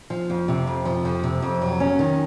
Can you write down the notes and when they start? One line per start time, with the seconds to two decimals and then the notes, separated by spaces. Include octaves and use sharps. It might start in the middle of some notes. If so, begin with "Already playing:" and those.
0.10 F3
0.30 F2
0.48 C3
0.67 F2
0.85 F3
1.05 F2
1.24 C3
1.42 F2
1.62 F#3
1.80 C#4
1.99 D#3